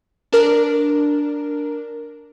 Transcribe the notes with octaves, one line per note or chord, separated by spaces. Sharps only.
D4 A#4